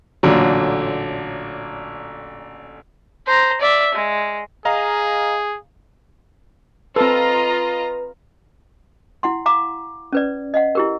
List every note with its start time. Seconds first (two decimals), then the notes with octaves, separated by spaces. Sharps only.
0.23 A1 A#2 D3 F#3
3.26 C5 A#5
3.61 D5 E5
3.94 G#3
4.65 G#4 D#5 F5 A#5
6.96 C4 F4 A4 B4 D#5 A#5
9.23 E4 F#5 C6
9.46 F5 A#5 D6
10.13 C#4 B4 D5
10.54 D#5 F5 F#5
10.75 E4 G4 A#4